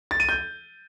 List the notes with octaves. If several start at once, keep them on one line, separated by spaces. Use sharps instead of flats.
A6
D#7
G6